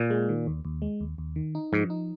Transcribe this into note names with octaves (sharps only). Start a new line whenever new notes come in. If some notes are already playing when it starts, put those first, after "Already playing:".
Already playing: A#2
G#3
D#3
D#2
D#2
G#3
D#2
D#2
D#3
D#4
G#2 F3
D#4